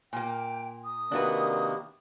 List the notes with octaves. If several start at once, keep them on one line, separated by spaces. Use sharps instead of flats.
A#2 A#3 G5
D#6
C3 D#3 A#3 D4 F#4 B4